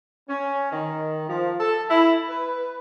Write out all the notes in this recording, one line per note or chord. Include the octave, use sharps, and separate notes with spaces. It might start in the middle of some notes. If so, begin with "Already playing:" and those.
C#4
D#3
F3
A4
E4
B4